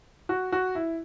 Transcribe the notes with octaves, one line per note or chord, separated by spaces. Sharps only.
F#4
F#4
E4